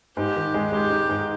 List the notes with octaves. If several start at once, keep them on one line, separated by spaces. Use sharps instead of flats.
G#2 G4
D#3
G#3
G#3 G4
D#4
G#2